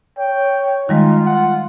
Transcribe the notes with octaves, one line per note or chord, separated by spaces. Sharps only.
C#5 G5
D#3 G3 G#3 D#4 F4
F#5